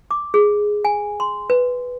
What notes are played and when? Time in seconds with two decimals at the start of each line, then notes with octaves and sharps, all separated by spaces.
0.11 D6
0.34 G#4
0.85 G#5
1.20 C6
1.50 B4